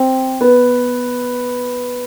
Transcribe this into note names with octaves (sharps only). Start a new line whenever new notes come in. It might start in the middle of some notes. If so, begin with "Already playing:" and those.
Already playing: C4
B3